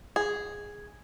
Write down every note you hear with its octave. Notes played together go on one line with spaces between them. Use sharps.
G#4